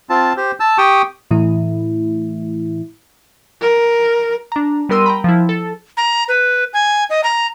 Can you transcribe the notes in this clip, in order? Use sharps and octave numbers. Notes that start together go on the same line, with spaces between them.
C4 F4 A5
G4 C5
A5 E6
G4 G5 C#6 D#6
A2 E3 A3 E4
A#4
D4 A#5
G3 B3 A#4 C6 E6 D#7
G5 A#5 B5
F3 E4
A4
A#5
B4
G#5
D#5
A#5